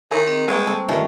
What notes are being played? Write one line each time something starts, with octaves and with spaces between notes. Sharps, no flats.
D#3 E4 A#4 C#5
C4 G#4 D#5
G3 G#3 A#3 B3 C#5 G5 C#6
C4 A4
G2 D#3 A3 C#4 D4 F4